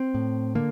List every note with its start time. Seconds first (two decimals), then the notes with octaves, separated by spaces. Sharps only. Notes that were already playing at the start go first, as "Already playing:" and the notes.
Already playing: C4
0.14 A2
0.55 D3 A#3